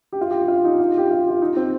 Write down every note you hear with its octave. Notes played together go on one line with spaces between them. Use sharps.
G4
F4
G4
F4
D#4
F4
G4
F4
F4
D#4
C4